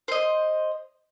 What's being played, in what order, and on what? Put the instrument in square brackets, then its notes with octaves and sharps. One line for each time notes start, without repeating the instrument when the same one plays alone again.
[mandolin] C5 D#5